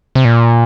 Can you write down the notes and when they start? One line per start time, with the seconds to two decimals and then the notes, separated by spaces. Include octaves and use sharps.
0.15 C3
0.25 A#2